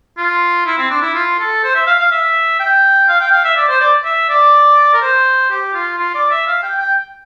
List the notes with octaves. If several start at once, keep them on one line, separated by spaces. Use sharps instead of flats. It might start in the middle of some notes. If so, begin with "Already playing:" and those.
F4
E4
C4
D4
E4
F4
A4
C5
E5
F5
F5
E5
G5
F5
G5
F5
E5
D5
C5
D5
E5
D5
A#4
C5
G4
F4
F4
D5
E5
F5
G5
G5